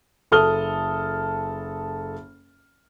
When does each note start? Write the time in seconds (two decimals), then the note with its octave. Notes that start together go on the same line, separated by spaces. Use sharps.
0.32 F#1 A4 D#6 F6 G7